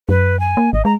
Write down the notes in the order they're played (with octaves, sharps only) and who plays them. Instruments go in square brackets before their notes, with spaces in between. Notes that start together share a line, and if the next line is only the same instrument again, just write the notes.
[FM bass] F#2 [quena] B4
[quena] G#5
[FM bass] A#3
[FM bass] G#1 [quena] D#5
[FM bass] G#3 [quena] A#5